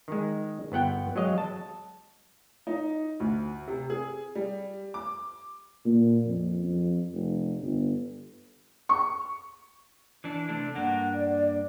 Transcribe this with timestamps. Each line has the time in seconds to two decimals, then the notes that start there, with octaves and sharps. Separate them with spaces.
0.08 D#3 G#3
0.72 G1 B3 F#5 G5
1.16 F#3 G#3 D#5 F5
1.38 A5
2.67 D#4
3.20 D2
3.67 C3
3.90 G#4
4.35 G3
4.94 D6
5.85 A#2
6.25 F2
6.64 F2
7.13 F1
7.60 G1
8.89 C#6
10.24 E3 D4
10.48 C3 A3 D4
10.75 G2 A#3 D4 F#5
11.13 D5